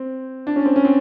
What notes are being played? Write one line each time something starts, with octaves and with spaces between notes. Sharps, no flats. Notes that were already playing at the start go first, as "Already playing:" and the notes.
Already playing: C4
D4
C#4
C4
C#4
C4